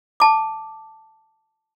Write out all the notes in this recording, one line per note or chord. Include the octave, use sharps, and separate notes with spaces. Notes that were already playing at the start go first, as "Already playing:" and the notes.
A5 D6